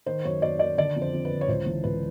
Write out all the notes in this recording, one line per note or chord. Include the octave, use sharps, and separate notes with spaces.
D#3 C5
F#2 C#5
F#2 D5
D#3 D5
D3 D5
F2
C5
F2
B4
D3
C#5
C#2 C5
E3
C#2 B4